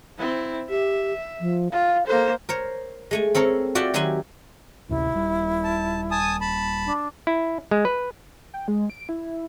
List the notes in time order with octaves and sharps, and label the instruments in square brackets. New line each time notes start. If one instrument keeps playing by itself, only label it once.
[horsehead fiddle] C4 E4
[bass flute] G4 [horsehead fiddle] E5
[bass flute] F3
[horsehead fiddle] F4 [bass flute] F5
[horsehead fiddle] A#3 C5 [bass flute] A4
[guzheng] A#4 C5 C#5
G#3 A3 G#5
C4 A4 A#4 C#5
F4 F#4 D5 E5 G5 A5
D#3 F#3 G4 E5 G#5 C6
[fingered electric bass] A1 D2 C3 [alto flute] E4
[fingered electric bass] D#1 G3
[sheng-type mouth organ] A5
G#5 A5 D#6
A5 B5
[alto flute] D4
[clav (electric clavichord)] E4
G#3
B4
[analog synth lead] G5
G#3
D7
E4